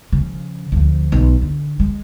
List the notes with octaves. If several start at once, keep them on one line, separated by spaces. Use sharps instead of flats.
C#3 F3
D2 F3
B1
D3
G#3